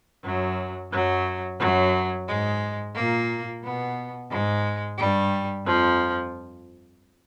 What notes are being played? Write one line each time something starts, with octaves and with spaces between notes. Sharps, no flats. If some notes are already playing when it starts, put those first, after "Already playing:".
F#2 F#3
F#2 F#3
F#2 F#3
G#2 G#3
A#2 A#3
B2 B3
G#2 G#3
G2 G3
F2 F3